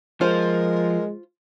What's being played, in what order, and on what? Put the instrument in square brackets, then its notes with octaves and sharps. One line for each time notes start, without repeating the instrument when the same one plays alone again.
[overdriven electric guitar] F3 [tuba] G#3 [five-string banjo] F4 C5 [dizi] A#4